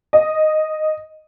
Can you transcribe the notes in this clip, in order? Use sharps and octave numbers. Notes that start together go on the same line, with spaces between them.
D#5